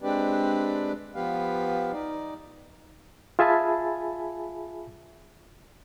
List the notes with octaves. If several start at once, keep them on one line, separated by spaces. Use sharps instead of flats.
G#3 C4 D4 G4 B4 D5
F3 B3 G4 B4 F5
D#4 D5
F4 G#4 E5 G#5 A5 B5